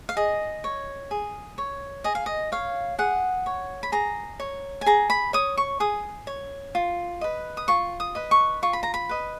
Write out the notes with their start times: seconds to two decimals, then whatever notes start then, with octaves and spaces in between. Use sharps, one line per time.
0.09 F5
0.17 G#4 D#5
0.64 C#5
1.11 G#4
1.58 C#5
2.04 G#4 D#5
2.15 F5
2.26 D#5
2.52 C#5 F5
2.99 G#4 F#5
3.46 C#5
3.83 B5
3.92 G#4 A#5
4.40 C#5
4.81 G#5
4.86 G#4 A#5
5.10 B5
5.33 C#5 D#6
5.57 C#6
5.80 G#4 D#6
6.27 C#5
6.75 F4
7.21 B4 D#5
7.57 D#6
7.68 F4 C#6
8.00 D#6
8.15 B4 D#5
8.31 C#6
8.63 F4 C#6
8.73 B5
8.83 A#5
8.94 B5
9.09 B4 D#5